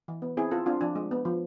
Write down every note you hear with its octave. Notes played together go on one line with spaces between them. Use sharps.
E3
B3
C4 E4 G#4
C4 F4 A4
C4 D4 F4
F3 D4
G#3
B3
F3